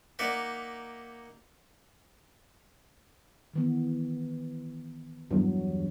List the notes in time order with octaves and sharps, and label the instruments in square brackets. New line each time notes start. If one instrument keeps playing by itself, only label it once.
[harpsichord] A#3 D#4 D5 E5 F#5
[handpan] D#3 E3 B3
[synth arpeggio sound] E2 G2 [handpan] F#3